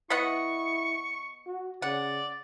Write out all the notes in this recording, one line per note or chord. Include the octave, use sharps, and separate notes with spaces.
B3 E4 D#5 F#5 C#6
F#4
C#3 D5 F#5